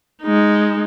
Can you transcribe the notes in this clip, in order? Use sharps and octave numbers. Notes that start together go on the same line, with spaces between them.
G#3 D#4